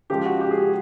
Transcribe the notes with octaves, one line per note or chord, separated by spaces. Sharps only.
C#3 F3 G#3 G4
F#4
G4
G#4
G4